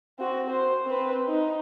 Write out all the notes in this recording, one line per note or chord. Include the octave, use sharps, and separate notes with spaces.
C4 F#4
C5
C4 B4
D#4